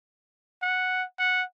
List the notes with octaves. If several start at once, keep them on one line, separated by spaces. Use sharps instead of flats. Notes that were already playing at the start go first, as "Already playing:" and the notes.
F#5
F#5